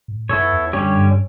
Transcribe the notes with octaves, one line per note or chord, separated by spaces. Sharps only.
A2
F#2 B3 E4 A4 C#5
E2
F#2 D3 G3 C#4 G4 C#5
G2